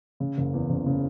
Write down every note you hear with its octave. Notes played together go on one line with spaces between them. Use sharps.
C#3
F#1
E2
F#1
C#3